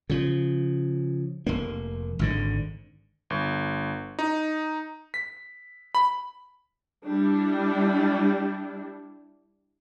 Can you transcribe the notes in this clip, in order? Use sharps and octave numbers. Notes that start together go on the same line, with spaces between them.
C#3 F3
F1 A#3
G#1 G#2 D3
G1
D#4
B6
B5
G3 D4 E4